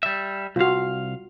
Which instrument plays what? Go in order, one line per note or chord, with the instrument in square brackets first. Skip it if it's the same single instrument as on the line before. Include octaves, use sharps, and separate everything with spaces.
[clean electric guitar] G3 E5
[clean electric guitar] C2 F5 [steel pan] F4 F#4